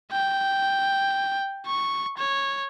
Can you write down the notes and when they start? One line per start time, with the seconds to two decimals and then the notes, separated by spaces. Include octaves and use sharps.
0.12 G5
1.66 C#6
2.18 C#5